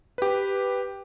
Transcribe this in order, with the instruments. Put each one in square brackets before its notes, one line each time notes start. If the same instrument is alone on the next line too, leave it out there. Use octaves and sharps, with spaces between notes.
[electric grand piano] G4 B4